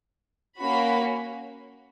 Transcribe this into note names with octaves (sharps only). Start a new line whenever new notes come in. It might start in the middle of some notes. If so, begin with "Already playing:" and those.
A#3 C#4 F#4 B5